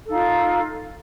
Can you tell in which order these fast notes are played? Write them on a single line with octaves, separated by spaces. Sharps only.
A4 D#4 F5 F4